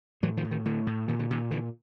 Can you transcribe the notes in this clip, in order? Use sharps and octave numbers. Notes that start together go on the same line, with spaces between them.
A2 E3 F#3
D#3 F3
A2
D#3
A2 D3
A2
A#2 D#3
D3
A#2 D#3
A#2 D3 E3